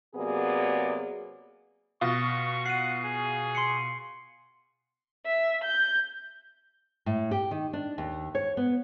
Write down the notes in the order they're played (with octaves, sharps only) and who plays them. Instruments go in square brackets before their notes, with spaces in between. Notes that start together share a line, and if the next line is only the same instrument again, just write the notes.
[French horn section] C3 F#3 A#3 B3 G#4 D5
[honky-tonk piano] B2 F4 [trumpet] C#6 [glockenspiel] D#6 A#6
[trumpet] F#5 [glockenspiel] C7 D#7
[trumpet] G#4
[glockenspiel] C6 C7 C#7
[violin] E5
G6
[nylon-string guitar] A2
G4
D#3
D4
D#2
C#5
B3